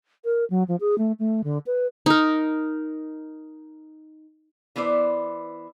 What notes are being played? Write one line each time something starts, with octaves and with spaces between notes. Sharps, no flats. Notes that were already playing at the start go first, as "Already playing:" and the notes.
A#4
F#3
F3
G#4
A3
A3
D3
B4
D#4 A#4
E3 B3 E4 C5 D5